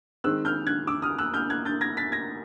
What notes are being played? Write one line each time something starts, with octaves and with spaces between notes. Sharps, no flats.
D#3 G#3 C4 E6 F#6
F6 G6
F#6 G#6
D6 E6
D#6 F6
E6 F#6
F6 G6
F#6 G#6
G6 A6
G#6 A#6
A6 B6
G#6 A#6